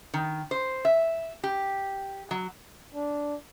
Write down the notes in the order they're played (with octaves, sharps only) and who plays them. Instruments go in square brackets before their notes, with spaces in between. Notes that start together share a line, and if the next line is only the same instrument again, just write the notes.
[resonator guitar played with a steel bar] D#3
C5
E5
G4
F#3
[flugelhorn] D4